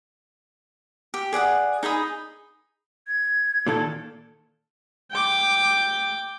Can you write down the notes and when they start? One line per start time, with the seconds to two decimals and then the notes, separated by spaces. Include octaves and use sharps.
1.14 G4
1.33 G#4 D5 F#5 D#6
1.83 D#4 G#4 B5 D#6
3.07 G#6
3.67 A#2 D#3 A4
5.11 G5 D6